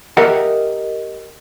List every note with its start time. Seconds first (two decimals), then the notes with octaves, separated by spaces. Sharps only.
0.17 G4 A#4 D#5 E5 F#5